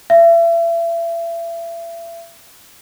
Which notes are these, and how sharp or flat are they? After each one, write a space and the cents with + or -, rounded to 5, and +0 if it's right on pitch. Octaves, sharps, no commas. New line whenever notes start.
E5 +35